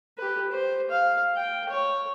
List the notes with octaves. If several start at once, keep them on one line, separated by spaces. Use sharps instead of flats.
G4 B4
C5
F5
G5
C#5